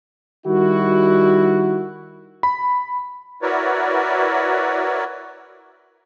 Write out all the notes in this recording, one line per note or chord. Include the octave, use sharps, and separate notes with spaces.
D#3 G3 E4 F#4
B5
E4 F#4 A#4 B4 C#5 D5